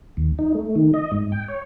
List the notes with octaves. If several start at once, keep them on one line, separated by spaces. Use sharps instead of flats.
D#2
D#4
A3
D#3
D#5
G#2
G5
C#5